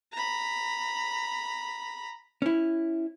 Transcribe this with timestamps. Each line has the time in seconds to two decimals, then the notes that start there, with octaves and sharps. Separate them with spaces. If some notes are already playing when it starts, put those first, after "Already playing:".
0.13 A#5 B5
2.42 C#4 E4